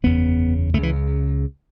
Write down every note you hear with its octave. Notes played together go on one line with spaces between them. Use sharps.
F#1 E2 C#3 B3
C#2 A3
C#3 E3